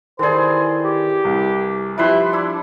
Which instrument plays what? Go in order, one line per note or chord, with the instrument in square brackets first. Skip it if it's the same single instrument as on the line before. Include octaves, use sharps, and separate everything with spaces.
[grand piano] D#3 A4 D5 [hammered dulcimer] E3 G#4 [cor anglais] C5
[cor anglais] G4
[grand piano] C2
[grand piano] F3 [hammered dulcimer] G3 B4 C6 [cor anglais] E4
[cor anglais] D4 [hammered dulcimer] E4